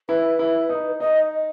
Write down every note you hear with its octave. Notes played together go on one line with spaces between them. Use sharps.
E4 B4
E4
D#4
D#4 D#5